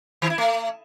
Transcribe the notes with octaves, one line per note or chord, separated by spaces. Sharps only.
D#3
E4
A3